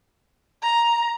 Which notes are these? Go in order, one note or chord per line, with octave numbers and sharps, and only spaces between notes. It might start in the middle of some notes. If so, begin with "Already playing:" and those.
A#5